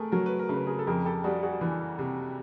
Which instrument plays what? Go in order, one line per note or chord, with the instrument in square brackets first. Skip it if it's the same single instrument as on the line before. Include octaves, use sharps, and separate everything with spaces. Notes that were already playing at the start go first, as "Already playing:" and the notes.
Already playing: [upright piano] A3 [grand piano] G#4 A#4
[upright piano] F#3 [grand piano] A#4
[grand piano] B4
A#4
[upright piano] C#3 [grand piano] B4
[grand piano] G#4 A#4
A4
[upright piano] F2 [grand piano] G#4 A#4
[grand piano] G4 A4
[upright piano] G3 [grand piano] F#4 G#4
[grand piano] F#4 G#4
[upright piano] E3
C3